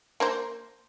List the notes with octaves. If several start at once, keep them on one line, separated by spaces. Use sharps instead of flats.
A#3 A#4 C5